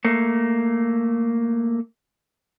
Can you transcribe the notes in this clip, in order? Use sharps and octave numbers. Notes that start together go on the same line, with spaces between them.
A3 A#3